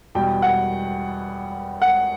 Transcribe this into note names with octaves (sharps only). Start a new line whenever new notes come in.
E2 B2 G3 G5
F#5
F#5